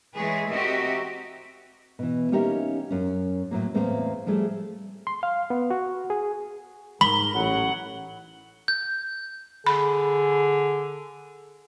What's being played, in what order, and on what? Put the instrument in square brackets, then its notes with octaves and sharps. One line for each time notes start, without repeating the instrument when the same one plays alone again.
[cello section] E3 G#3 G#4 B4 C#5
C4 F#4 G4 A#4 D#5 E5
[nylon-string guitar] B2 E3
A#3 C#4 D#4 G4 A#4 E5
F#2 C#4
A2 F#3 A#3
E2 A2 A#3 C4 A#4 C5
F3 G3 A3 G#4
[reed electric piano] C6
F5
B3
F#4
G#4
[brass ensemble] G#2 A#4 [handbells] B5 [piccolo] G7
[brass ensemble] A1 F#3 [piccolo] F#5
[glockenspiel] G6
[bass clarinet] D3 [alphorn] G#4 [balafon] B5